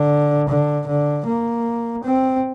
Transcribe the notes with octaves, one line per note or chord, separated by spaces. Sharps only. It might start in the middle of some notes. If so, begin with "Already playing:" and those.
Already playing: D3
D3
D3
A#3
C4